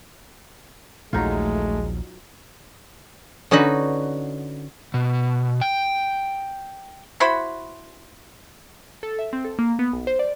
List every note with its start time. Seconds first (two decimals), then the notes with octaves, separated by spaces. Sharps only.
1.13 A#1 D#2 F#3 G#3 A3 D#4 F4
3.51 D3 C#4 D#4 F#4 B4
4.94 B2
5.61 G5
7.20 E4 F#4 C5 B5
9.03 A4
9.19 E5
9.33 C4
9.45 A4
9.59 A#3
9.79 B3
9.92 B1
10.07 C5
10.19 D5